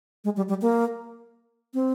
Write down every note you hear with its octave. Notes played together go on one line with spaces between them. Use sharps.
G#3
G3
G3
A#3
C4